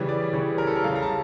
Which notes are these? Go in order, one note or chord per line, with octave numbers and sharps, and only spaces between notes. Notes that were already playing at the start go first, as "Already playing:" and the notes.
Already playing: C#3 E3 G3
D5
C#3 E3 G3 C#5
A#4
A4
A#4
C#3 G3 F5
A#5
A5